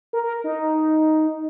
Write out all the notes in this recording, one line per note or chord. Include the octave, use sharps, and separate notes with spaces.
A#4
A#4
D#4